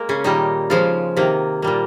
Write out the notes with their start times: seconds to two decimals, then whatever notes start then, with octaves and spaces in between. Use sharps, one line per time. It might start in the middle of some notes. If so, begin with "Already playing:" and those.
Already playing: G#3 A#3 A#4
0.09 C#3 C#4
0.24 A#2 D#3 G3 A#3 D#4
0.70 C#3 F3 G#3 F4
1.17 C3 D#3 A#3
1.62 A#2 G3 A#3